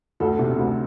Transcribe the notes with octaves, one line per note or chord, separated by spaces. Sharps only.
D2 A4
C3
D2